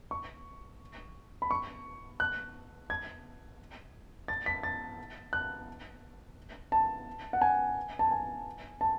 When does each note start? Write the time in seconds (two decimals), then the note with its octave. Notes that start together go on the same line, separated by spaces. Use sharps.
0.11 C#6
1.42 B5
1.51 C#6
2.20 F#6
2.90 G#6
4.28 A6
4.46 B6
4.63 A6
5.33 F#6
6.72 A5
7.33 F#5
7.42 G#5
7.99 A5
8.11 G#5
8.81 A5